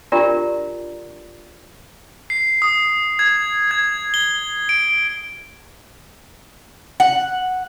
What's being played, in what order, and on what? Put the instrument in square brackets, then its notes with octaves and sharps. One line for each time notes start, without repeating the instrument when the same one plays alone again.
[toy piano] D4 F4 G4 A#4 D5 A#5
[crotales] C7
D#6
G#6
G#6
G7
D7
[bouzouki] F#5